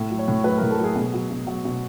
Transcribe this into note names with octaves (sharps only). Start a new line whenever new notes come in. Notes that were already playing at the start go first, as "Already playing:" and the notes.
Already playing: A2
F#3
C#5
A2
F#3 B4
A#4
A2
A4
F#3
G#4
B2
F#3
B2
F#3 F#4
B2